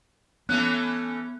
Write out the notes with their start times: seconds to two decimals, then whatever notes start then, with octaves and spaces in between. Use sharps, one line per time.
0.49 E3 A3 B3 C#4 F#6